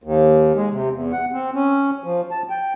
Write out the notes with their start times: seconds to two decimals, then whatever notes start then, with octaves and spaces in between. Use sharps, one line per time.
0.04 D#2
0.56 G#3
0.71 C3
0.91 E2
1.12 F#5
1.32 C4
1.55 C#4
2.04 F3
2.31 A5
2.50 G5